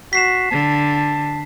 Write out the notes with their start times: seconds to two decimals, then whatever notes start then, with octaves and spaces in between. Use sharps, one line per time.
0.13 F#4 B6 C7 E7
0.51 D3 A5